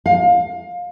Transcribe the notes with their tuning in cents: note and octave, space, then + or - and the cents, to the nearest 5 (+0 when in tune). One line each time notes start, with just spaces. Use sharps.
F5 +25